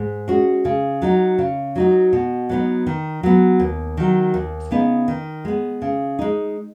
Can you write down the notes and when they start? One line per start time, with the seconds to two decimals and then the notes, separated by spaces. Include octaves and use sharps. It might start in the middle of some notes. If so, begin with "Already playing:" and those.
Already playing: G#2
0.28 G#3 C#4 F#4
0.65 C#3
1.02 F#3 D#4 F#4
1.38 C#3
1.76 F#3 D#4 F#4
2.13 B2
2.50 F#3 B3 D#4
2.87 D#3
3.23 F#3 B3
3.60 D#2
3.97 D#3 F#3
4.34 D#2
4.71 C#3 B3 D#4
5.08 D#3
5.45 G#3 B3
5.82 C#3
6.19 G#3 D#4